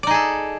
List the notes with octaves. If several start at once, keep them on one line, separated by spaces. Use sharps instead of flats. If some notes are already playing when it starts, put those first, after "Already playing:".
D#4 G#4 A4 D5